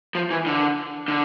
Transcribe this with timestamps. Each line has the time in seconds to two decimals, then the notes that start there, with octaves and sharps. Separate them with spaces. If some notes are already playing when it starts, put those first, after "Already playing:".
0.15 F3
0.31 E3
0.46 D3
1.08 D3